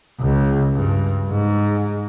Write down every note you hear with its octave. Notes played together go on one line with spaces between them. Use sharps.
C#2
G2
G#2